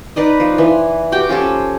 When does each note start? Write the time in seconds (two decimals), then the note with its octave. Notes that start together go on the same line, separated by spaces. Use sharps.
0.16 D#4 B4 D5 D#5
0.40 F3
0.58 E3
1.12 F#4 G4 G5 D6
1.29 F3 C#4 G4 A4